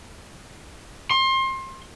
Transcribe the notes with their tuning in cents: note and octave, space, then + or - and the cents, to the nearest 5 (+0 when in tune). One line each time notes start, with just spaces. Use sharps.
C6 +30